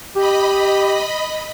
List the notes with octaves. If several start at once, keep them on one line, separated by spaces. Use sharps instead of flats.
G4 D#5 B5